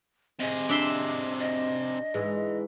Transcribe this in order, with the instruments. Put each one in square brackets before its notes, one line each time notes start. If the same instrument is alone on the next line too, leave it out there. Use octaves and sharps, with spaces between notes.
[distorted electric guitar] C3 G#4 [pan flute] D#5
[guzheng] D4 E5 C6
[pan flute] D#5
[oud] G#2 E3 G#3